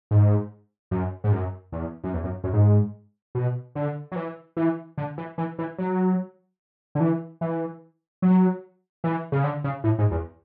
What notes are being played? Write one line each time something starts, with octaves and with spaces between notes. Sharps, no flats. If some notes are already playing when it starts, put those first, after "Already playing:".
G#2
F#2
G#2
F#2
E2
F#2
E2
F#2
F#2
G#2
B2
D3
F#3
E3
E3
D3
E3
E3
E3
F#3
D3
E3
E3
F#3
E3
C#3
D3
C#3
A2
G#2
E2